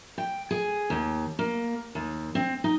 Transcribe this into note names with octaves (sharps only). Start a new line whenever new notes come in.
G5
G#4
D#2
A#3
D#2
C4
D#4